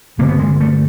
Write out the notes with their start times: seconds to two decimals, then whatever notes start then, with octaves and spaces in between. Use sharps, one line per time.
0.18 G2 D3 A#3
0.29 B3
0.39 G#3
0.60 A3